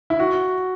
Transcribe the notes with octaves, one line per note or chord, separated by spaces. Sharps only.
E4
F#4